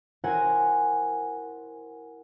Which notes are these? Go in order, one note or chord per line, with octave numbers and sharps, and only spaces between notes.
E4 F#4 A#4 C5 F#5 G#5